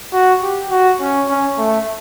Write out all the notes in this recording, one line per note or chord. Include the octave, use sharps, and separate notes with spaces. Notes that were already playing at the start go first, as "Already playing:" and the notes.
F#4
G4
F#4
C#4
C#4
A3